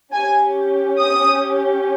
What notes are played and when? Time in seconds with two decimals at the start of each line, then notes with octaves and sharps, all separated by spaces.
0.13 C#4 G4 G#5
1.00 D#6